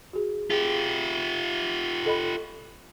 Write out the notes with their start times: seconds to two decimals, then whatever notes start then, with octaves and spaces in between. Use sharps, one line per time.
0.13 F#4 G#4
0.50 F4 G4 G#4
2.06 A4 D#5 B5